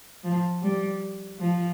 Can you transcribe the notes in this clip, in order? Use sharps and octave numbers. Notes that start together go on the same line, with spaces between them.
F3
G3
F3